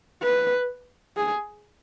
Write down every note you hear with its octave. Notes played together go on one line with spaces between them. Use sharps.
B4
G#4